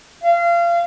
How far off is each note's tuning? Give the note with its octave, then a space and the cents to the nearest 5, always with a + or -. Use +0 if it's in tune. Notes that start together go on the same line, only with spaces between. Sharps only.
F5 -30